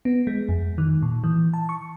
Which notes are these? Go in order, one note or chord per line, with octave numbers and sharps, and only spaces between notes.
B3
G#3
F2
D#3
A#2
E3
A5
C#6